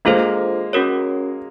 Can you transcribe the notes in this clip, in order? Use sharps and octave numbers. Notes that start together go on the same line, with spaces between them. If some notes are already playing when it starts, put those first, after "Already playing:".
G#3 A#3 D4 F4 A4 C5
C#4 F#4 A#4 C#5